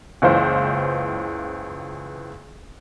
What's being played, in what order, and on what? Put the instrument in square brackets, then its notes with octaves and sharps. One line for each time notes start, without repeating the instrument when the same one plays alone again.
[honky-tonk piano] F#1 C#2 E3 F4 C5